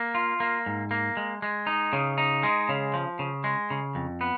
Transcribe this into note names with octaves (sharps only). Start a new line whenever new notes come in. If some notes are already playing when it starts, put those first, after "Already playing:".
Already playing: A#3
F4
A#3
G#2
A#3
G#3
G#3
D#4
C#3
D#4
G#3
C#3
F3
C#3
G#3
C#3
F2
B3